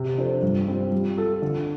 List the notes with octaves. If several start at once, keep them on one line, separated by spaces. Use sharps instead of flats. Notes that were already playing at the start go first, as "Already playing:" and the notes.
Already playing: C3
F3 D4 A4 C5
G2
G3 C4 F4
G3
F4 A4
D3